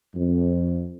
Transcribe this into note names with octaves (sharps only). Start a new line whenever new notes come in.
F2